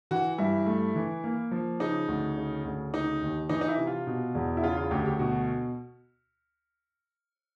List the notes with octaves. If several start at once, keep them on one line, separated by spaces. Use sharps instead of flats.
E3 F#4
G2 E4
A3
E3
A#3
F3
C#3 D#4
D2
C#3
D2
C#3 D#4
D#2
E3 D#4
D#4
E4
C3
F4
B2
E2
E4
C#3 F4
F4
D2 G4
G4
B2 F#4